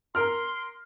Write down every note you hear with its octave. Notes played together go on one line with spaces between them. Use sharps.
A#4 C6 F6